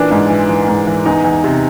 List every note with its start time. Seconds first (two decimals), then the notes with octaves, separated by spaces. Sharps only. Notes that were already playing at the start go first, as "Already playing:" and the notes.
Already playing: A#2 E3 D4
0.11 G#2
0.29 E3
0.49 E3
0.68 G#2
0.87 E3
1.06 E2 D#4
1.24 E2
1.44 C3